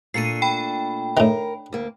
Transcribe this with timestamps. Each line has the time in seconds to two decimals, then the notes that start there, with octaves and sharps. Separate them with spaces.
0.14 A#2 A3 D4 C7 C#7 D#7
0.42 G5 B5
1.17 A2 D#3 A#4
1.73 D2 A#3